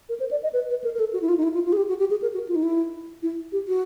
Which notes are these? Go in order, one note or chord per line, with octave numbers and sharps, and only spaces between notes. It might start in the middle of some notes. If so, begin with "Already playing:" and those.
A#4
C5
D5
D#5
B4
B4
A#4
A#4
A4
F#4
E4
F4
D#4
E4
F4
F4
G#4
G4
F#4
G4
G#4
A#4
F#4
F4
D#4
E4
E4
G4
F#4